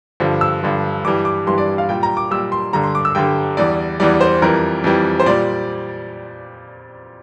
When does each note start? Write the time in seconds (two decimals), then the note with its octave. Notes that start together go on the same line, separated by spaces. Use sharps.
0.20 G2 D3 F3
0.41 E6
0.62 G2 D3 F3
1.04 G2 E3 G3 D6
1.25 D6
1.46 G2 E3 G3 C6
1.58 D5
1.78 F5
1.89 A#2 G3 G5
2.03 A#5
2.17 D6
2.31 A#2 G3 E6
2.52 C6
2.73 G2 D3 G3 A#5
2.84 C6
2.95 D6
3.05 E6
3.15 G2 D3 G3 G5
3.57 E2 E3 G3 D5
4.00 E2 E3 G3 D5
4.21 C5
4.42 F2 E3 G3 A#4
4.84 F2 E3 G3
5.20 C5
5.26 A#2 G3 D5